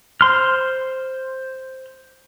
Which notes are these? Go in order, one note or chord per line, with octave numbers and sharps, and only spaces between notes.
C5 C6 F6